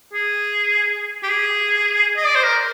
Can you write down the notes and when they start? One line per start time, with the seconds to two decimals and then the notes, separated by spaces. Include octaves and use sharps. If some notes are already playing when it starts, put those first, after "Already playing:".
0.13 G#4
1.23 G4
1.29 G#4
2.16 D#5
2.26 D5
2.35 C5
2.44 A#4